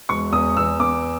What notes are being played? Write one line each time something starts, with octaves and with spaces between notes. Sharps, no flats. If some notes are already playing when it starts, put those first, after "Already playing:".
E1 C#6
E2 D#6
E2 E6
E2 D6